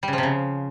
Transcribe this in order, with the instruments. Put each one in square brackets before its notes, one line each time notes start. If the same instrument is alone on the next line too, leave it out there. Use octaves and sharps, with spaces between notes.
[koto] G3
C#3
F3
C3
C#3